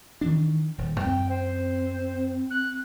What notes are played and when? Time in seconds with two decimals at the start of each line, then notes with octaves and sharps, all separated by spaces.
0.21 D#3 E3 D4
0.78 D#1
1.00 F#2 C4 G5
1.29 C5
2.51 F#6